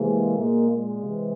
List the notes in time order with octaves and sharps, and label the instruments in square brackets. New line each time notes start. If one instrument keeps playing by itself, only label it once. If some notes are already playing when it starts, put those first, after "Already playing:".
Already playing: [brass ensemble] C3 E3 G#3 A#3
A#2 G#3 A#3
G#3
C3 E3